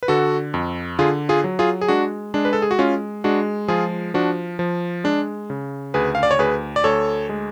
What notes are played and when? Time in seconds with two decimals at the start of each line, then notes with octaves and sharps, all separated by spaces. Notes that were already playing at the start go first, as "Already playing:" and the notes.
0.03 B4
0.08 D3 F#4 A4
0.54 F2
0.99 D3 F4 G#4
1.29 F4 G#4
1.44 F#3
1.59 F4 G#4
1.81 G#4
1.88 G#3 D4 F#4
2.34 G#3 D4
2.45 B4
2.53 A4
2.62 G#4
2.71 F#4
2.78 G#3 C#4 F4
3.24 G#3 D4 F#4
3.68 F3 F4 G#4
4.14 F3 D4 F#4
4.59 F3
5.04 G#3 D4
5.50 C#3
5.94 D2 G#4 B4
6.15 F5
6.23 D5
6.31 C#5
6.39 D2 G#4 B4
6.76 D5
6.84 D2 A4 C#5
7.29 G#3